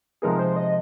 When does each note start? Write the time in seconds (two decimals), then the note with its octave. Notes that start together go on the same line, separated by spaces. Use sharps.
0.22 C3 F3 G#3 D#4 G#4 A#4
0.39 C5
0.56 D#5